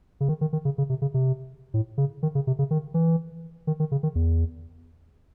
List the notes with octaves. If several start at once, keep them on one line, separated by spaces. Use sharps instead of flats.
C#3
D#3
D#3
D#3
C#3
C#3
C3
C#3
C3
A2
C#3
D#3
C#3
C3
C#3
D#3
E3
D#3
D#3
C#3
D#3
E2